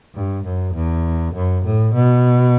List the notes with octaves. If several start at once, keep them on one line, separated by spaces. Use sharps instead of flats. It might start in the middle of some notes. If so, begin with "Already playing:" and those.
G2
F#2
E2
F#2
A2
B2